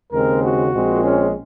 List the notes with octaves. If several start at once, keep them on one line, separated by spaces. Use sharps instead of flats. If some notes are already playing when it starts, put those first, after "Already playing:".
D#2 C#3 G#3 C4 A#4
F#4
A#1 A#2 G#3 C4
C#4